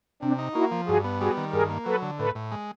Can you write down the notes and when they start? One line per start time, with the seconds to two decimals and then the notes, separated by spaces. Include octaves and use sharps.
0.22 C3 C4 D4
0.39 D#4
0.55 A#3 E4 F#4
0.71 F3
0.88 G2 F#4 G#4
1.04 B3
1.21 G3 F#4 G#4
1.37 D#3
1.53 G2 G#4 A#4
1.70 A#3
1.86 F#3 A4 B4
2.02 D3
2.19 A2 A4 B4
2.35 A2
2.51 G#3